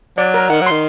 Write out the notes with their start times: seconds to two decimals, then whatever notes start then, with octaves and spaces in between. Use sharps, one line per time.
0.18 F#3 D5
0.34 A#4
0.50 D#3 F#5
0.61 F#3
0.66 D#3 C6